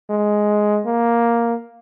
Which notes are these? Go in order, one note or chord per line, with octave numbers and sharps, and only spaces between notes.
G#3
A#3